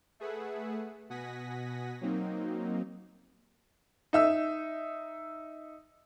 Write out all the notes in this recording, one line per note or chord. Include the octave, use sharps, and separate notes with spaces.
A3 G#4 B4 E5 F#5
B2 F#5 G#5 D#6 A#6 B6
F#3 A#3 C4 D#4
D#4 E5 E6